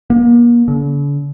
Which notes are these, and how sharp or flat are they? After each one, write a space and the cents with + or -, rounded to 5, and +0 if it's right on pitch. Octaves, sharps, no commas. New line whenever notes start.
A#3 +35
D3 -45